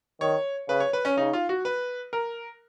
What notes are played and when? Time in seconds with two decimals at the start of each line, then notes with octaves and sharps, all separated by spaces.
0.21 D#3 C#5
0.69 C#3 B4
0.80 C#5
0.93 B4
1.05 C#4
1.17 C#3 D#4
1.33 F4
1.49 F#4
1.65 B4
2.13 A#4